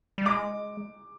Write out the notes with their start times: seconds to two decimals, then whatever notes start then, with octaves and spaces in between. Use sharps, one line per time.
0.18 G3
0.25 G#3 D6